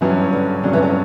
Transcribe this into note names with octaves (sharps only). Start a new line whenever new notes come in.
G2 E3 F#3 C#4
E3
D3
G2 D3 F#3 C#4
E3
D3